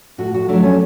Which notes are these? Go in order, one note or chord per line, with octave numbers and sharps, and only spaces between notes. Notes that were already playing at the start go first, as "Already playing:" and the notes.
A2 F#4
F#4
F#3 A3 D4
C#4